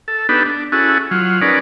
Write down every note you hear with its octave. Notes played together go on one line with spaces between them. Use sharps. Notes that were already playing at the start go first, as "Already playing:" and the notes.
A4
B3 D4 D#4 G4 A4 B4
D4
C#4 E4 F#4 G#4 A4
F#3 F4
C#4 D#4 G#4 A#4 B4 D5